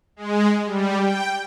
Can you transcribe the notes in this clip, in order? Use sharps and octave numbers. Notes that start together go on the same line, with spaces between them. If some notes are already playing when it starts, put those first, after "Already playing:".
G#3
G3
G5